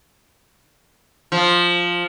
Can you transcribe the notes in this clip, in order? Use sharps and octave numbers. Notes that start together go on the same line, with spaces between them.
F3